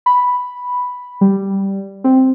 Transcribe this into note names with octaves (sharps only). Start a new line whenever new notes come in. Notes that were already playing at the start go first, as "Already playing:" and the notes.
B5
G3
C4